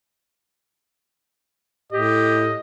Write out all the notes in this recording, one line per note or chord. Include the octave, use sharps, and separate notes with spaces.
A2 G4 D#5